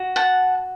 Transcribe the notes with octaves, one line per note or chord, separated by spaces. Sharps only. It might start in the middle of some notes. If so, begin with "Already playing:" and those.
Already playing: F#4
F#5 A5